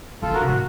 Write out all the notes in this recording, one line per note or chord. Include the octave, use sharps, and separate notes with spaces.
F3 F4 A4
D#3 F#4 A#4
C3
A2 F#4